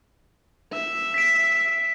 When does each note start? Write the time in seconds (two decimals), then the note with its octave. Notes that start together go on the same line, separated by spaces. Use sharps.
0.73 E5
1.14 B6 D7